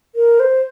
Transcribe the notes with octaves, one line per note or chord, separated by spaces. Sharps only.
A#4
C5